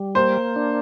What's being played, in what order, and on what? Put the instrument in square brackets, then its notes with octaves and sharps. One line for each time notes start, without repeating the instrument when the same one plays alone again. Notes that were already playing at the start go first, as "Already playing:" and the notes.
Already playing: [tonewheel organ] G3
[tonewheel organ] A#3 [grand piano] C5
[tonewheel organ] D4